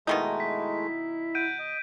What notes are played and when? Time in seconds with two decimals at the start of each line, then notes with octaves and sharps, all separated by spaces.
0.07 B2 D#3 G#3 A3 D#4 E4
0.40 B6
1.35 F#5 G6 D7 D#7
1.59 D#5